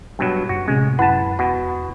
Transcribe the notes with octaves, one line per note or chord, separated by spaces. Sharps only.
G2 B2 F#3
F#1 F#4
A2 C3 G#3 C#4
F#2 E4 B4 F#5 A5
E1 B2 F#5